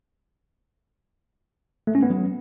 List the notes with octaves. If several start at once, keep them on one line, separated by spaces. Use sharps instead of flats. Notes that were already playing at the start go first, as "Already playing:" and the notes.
A3
C#4
B3
F#3